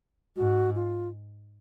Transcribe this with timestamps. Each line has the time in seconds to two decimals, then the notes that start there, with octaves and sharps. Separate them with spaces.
0.37 G#2 F#4
0.75 F4